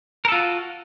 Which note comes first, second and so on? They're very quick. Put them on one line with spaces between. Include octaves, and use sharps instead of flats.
A#4 A4 F4 F#4